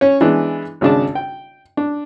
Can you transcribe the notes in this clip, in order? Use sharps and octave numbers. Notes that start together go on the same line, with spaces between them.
C#4 C#5
E3 G#3 B3 D4
G#1 C#3 D4 A5
G5
D4